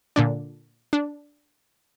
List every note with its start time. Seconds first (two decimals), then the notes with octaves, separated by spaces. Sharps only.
0.16 A#2 D3 D4
0.93 D4